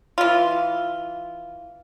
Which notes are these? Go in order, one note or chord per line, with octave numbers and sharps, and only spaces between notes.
E3 F4